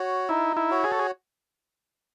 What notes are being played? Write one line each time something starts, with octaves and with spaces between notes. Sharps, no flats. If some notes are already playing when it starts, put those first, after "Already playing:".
Already playing: F#4 C#5
D#4 E4
E4
F#4 C#5
G#4
A4
G#4